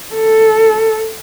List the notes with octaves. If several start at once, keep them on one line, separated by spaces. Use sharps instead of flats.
A4